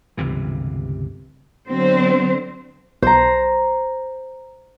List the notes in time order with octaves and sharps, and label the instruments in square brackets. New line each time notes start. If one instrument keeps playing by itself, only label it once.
[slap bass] G1 C#2 C3 E3
[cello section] D3 F#3 B3 C4 C5
[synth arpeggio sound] B1 [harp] C5 A#5